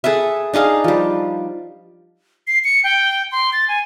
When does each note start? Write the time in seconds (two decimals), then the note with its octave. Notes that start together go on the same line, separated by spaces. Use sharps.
0.04 G#4 A4 B4 E5
0.54 D4 D#4 G#4 F5
0.84 F3 G3
2.47 C7
2.64 C#7
2.84 G5
3.32 C6
3.53 A6
3.68 G#5